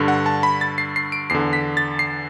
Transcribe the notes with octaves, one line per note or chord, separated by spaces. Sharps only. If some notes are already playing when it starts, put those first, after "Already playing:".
Already playing: G2 D3
F#5
A5
B5
A6
C7
C7
D7
E2 D3 C7
B6
A6
C7